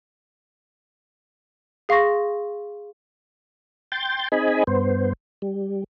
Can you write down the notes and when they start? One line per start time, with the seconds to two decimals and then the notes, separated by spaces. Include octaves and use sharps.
1.89 G#4 F5 C6 C#6 A#6
3.92 G5 C6 G6 A6
4.32 C4 D#4 G#4 D#5 G#5 B5
4.67 G2 B3 C5
5.42 G3